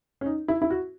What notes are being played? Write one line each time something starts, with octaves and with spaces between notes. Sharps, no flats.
C#4
D#4
E4
E4
F#4